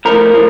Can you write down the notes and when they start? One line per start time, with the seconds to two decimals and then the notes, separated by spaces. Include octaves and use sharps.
0.05 A2 F3 A#4
0.33 A2 F3